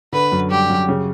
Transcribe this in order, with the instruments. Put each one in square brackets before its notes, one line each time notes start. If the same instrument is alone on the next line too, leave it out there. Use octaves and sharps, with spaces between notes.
[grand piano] D3 [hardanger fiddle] B4
[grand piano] F#2
[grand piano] G3 [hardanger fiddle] G4
[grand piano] F#2
C#3